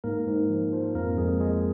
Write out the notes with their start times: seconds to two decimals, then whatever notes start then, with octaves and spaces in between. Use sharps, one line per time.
0.04 G#2 A#3 A#4
0.27 G#2
0.50 F3
0.72 F3
0.94 F2 A#3 A#4
1.17 F2 G#3 G#4
1.40 G#3 G#4